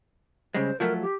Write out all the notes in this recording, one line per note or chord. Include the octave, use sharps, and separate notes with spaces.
C#3 G3 G#3 C5
F3 F#3 A3 A#4
G4